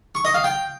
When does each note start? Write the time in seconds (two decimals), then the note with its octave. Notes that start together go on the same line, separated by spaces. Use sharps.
0.15 C#6
0.25 D#5
0.34 F5
0.44 G5